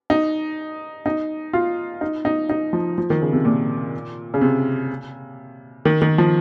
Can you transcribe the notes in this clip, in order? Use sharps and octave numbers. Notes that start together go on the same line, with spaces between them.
D#4
D#4
F4
D#4
D#4
D#4
F3
F3
D#3
C#3
C3
A#2
C#3
C3
D#3
D#3
F3